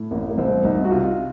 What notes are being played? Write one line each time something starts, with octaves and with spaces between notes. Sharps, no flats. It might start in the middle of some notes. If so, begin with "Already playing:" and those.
Already playing: A2
A1 A#3
A#3
C2 C4
C2 D#4
F#4
C3 F4